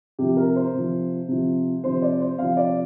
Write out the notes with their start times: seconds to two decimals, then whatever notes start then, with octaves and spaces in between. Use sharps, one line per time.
0.19 C3 F3 G4
0.37 A#4
0.56 C5
0.74 C3 F3
1.28 C3 F3
1.84 C3 F3 C5
2.02 D5
2.20 C5
2.39 C3 F3 F5
2.57 D5